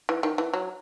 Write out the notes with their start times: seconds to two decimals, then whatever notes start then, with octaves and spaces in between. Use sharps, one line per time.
0.09 E3
0.23 D#3
0.38 E3
0.54 F#3